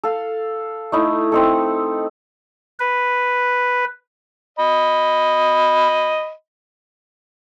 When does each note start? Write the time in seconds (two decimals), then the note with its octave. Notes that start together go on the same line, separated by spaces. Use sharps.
0.04 A4 F5
0.92 A3 D#4 E4
1.32 C4 D#4 A4
2.80 B4
4.59 D#5 B5